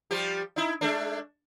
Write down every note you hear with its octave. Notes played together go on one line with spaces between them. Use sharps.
F3 G3 G4
D#4 E4
G#3 A3 D4